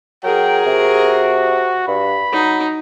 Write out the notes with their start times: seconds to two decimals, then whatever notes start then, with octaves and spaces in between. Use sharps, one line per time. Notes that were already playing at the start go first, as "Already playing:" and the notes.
0.23 F#3 G#4 A#4 G5
0.66 C3 F#4
1.88 G2 B5
2.32 F#3 D#4